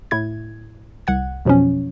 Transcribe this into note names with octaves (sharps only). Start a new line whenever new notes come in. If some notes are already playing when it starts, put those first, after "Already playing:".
A2 E4 G#6
C2 F#5 G#6
F2 B2 F3 F#3 C#4